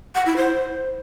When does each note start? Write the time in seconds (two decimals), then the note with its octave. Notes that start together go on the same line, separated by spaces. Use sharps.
0.15 F#5
0.26 E4
0.37 C5